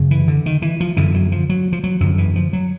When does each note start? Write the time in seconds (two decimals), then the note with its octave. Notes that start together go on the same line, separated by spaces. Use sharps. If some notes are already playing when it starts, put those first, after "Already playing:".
Already playing: F#2 C#3
0.11 E3
0.28 D3
0.46 D#3
0.62 E3
0.80 F3
0.97 F#2 D3 E3
1.14 F#3
1.32 F3
1.50 F#3
1.73 F3
1.84 F#3
2.00 F#2 D3 F3
2.18 E3
2.36 F3
2.53 F#3